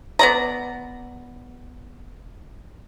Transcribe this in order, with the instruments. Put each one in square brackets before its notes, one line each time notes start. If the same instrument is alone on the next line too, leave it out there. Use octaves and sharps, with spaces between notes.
[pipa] B3 D5 A#5